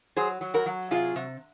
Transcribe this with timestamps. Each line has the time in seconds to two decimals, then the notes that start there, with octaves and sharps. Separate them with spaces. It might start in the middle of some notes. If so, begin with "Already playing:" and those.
0.17 F#3 G#4 C5
0.41 F#3
0.54 F#4 A#4
0.66 F#3
0.91 C3 F4 G#4
1.16 C3